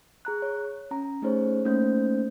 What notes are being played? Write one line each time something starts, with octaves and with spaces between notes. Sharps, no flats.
G#4 A#5 F#6
C#5
C#4 A#5
A3 C#4 D#4 G#4 C5 C#5
A3 A#3 C#4 D#4 C5 G6